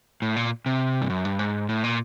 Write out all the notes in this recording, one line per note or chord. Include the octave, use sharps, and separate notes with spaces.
A2
A#2
C3
G2
F#2
G2
G#2
A2
A#2